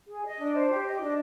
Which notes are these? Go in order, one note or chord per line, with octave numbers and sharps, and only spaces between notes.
G#4
D#5
D4
C5
G4
D#5
D4